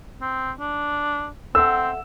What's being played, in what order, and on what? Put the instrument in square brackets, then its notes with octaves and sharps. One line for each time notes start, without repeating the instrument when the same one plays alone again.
[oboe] C4
D4
[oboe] C4 [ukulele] A4 E5 F#5 [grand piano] E6